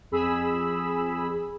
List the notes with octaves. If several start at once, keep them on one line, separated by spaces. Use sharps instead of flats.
F2 G#4 B5 E6